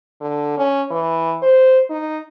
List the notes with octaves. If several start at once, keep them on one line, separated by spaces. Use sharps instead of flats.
D3
C#4
E3
C5
D#4